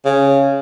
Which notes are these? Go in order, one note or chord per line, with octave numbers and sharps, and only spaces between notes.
C#3